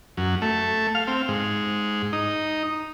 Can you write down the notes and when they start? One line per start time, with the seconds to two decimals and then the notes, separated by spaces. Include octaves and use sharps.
0.17 F#2
0.42 A3
0.95 F5
1.07 C4
1.28 G#2
2.13 D#4